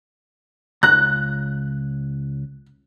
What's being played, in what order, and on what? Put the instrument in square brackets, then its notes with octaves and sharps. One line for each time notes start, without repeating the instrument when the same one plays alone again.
[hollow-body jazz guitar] C#2 A#5 [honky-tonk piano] F#6